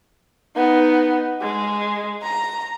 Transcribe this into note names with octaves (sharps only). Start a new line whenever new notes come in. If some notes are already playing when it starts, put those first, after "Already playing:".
B3 D#4
G#3
A#5